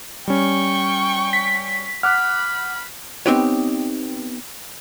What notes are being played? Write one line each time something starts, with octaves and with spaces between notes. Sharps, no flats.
G3 C#4 G5 C#6
B6
F#5 B5 D6 F6 F#6
B3 C4 D#4 G4 B4 C#5